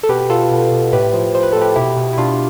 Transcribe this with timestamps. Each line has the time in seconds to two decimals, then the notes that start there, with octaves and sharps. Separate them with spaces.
0.03 A4
0.09 B2 G4 B4
0.30 B2 F4 A4
0.51 B2
0.72 B2
0.93 A2 G4 B4
1.14 F3
1.35 F3 C5
1.43 B4
1.52 A2 A4
1.61 G4 B4
1.76 B2 E4 G4
1.97 B2
2.13 E4
2.18 B2 D4 F4